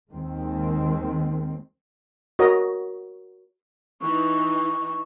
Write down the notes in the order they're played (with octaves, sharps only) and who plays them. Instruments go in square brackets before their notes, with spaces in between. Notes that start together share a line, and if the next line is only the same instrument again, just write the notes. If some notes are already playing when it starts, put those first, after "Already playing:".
[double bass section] D#2 D#3 G#3 C4
[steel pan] F#4 A#4 C#5 D#5
[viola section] E3 D#4 [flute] C#6